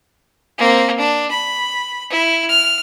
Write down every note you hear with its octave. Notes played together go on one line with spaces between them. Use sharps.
A#3 C4
D4
B5
E4
F6